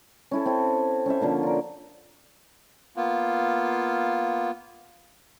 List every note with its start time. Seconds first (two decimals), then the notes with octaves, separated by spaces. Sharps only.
0.31 C#4 E4 A4
0.46 C4 E4 A4
1.06 C#4 A4 C5 E5
1.21 D3 F3 A#3 C#4
1.43 F4 A#4
2.96 A#3 B3 F4